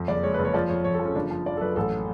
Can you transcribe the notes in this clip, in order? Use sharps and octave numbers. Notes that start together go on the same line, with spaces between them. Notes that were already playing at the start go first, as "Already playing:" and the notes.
Already playing: F2
F#1 D5
G#3 C#5
B4
F#1
C#5
F3 D5
F2 C#5
F2 C#5
A4
F3
C#4
F#1 D4
F3
F3 D5
A4
F#2 B4
A1 A4